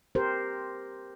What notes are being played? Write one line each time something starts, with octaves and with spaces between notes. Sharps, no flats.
G4 A#4 C5